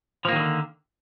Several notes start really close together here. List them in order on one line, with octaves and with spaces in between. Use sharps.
F3 A#3 D#3 F#3 D3